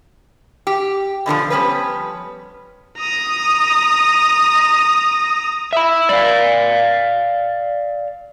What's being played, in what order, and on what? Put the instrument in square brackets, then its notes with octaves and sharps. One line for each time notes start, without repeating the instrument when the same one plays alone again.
[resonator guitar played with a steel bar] G4
B2 D3 E3 F3
F3 G3 B3 C#4 B4
[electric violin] A#5 D#6
[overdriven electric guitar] E5 B5
D5 F5